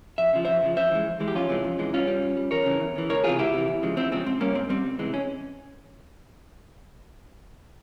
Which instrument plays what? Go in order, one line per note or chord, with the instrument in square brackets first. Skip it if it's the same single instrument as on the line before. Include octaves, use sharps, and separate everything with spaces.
[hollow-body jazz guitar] F2 E5
C#3 F3
F2 C5 E5
C#3 F3
F2 C5 E5
E3 G#3
F2
E3 G#3
G4
F2 C#4 F4
C3 E3 G#3
F2
C3 E3 G#3
G2 C#4 F4
G3
G2
G3
E2 A#4 C#5
C#3 E3
E2
C#3 E3
C#2 A#4 C#5
C3 E3 F4 G#4
C#2 E4 G4
C3 E3
E2
C#3 F3 G#3
E2 C4 E4
C#3 F3 G#3 C4
G#2 C4
G3 A#3 C#4
G#2 C4
G3 C4
C#2
C3 E3 G#3
C#4